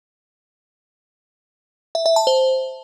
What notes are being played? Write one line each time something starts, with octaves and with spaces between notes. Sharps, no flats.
E5
E5
A5
C5